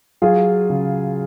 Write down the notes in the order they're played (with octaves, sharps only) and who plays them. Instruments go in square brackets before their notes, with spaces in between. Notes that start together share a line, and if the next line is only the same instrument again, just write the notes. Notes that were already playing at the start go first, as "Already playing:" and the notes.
[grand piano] F#3 [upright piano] F4 G#4
[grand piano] C#3